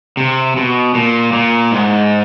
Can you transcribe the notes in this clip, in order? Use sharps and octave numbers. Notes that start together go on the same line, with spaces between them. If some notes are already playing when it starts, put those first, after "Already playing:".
C3
B2
A#2
A#2
G#2